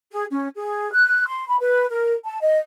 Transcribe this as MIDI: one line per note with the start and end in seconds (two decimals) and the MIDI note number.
0.12 0.25 68
0.30 0.48 61
0.56 0.91 68
0.93 1.26 90
1.27 1.46 84
1.47 1.57 83
1.60 1.86 71
1.91 2.14 70
2.25 2.40 81
2.42 2.58 75